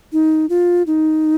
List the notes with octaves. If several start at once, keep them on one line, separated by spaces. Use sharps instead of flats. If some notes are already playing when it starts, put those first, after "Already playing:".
D#4
F4
D#4